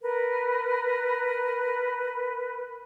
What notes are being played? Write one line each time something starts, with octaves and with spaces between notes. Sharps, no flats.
A#4 B4